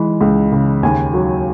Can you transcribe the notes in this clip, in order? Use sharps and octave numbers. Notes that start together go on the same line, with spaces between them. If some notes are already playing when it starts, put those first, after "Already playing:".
Already playing: E3 G#3
C#2
C#3
D#2 G#5
F#3